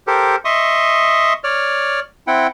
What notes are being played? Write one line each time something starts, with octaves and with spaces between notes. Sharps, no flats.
G4 A4 A#4 C5
D#5 E5 C6 C#6 D#6
C#5 D5 F6
C4 E4 F#5 G5